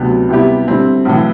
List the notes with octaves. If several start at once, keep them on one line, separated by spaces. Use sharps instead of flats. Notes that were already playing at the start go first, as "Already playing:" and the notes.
Already playing: D2 C3 F#3 B3 F#4
C3 G3 B3 E4 G4
D3 G3 C4 E4
B1 A2 E3